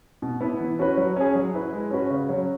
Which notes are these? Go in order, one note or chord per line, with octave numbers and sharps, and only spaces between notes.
B2
B3 E4 B4
E3
C#4 F#4 B4
F#3
C#4 G#4
F#3
E4 B4
G#3
C#4 F#4 B4
C#3
F#3 C#4